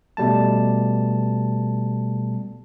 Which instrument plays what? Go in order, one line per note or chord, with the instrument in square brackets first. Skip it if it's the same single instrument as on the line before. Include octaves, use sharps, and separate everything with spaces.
[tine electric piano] B2 G3 A3 A5